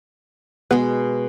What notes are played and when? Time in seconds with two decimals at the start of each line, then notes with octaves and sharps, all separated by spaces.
0.71 B2 G#3 B3 G#4 B4